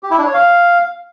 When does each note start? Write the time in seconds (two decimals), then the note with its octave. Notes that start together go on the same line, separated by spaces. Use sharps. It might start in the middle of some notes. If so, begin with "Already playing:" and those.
0.03 G4
0.11 E4
0.18 D4
0.26 C#5
0.34 F5